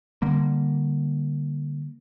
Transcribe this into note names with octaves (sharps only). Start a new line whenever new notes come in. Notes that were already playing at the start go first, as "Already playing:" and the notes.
D3 G3 A#3